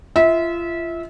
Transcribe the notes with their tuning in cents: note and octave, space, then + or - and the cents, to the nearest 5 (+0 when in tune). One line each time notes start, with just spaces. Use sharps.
F4 -30 E5 -25